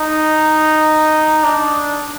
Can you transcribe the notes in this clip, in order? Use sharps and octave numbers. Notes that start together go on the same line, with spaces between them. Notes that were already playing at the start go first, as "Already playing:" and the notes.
Already playing: D#4
D4